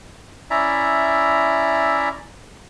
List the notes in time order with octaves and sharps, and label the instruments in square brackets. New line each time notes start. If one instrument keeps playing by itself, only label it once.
[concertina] C#4 E4 D5 E5 A#5